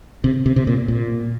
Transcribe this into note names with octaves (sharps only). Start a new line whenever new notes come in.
C3
C3
C3
A#2
A#2